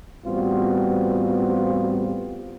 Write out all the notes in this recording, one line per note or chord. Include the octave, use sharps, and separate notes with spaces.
A1 G3 B3 C4 F4 F#4